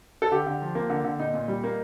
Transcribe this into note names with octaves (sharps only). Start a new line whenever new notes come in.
A4
D3 G4
D3
F3
A#3
D3
D3
A#2 D#4
A#2
G3
A#3